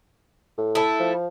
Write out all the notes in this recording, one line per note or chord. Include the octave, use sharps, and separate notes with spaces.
A2
A3 E4
F3